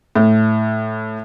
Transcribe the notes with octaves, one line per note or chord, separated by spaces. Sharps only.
A2